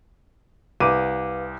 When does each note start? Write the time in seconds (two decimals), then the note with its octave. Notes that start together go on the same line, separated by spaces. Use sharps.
0.80 C2 B4 F5 D6 D#7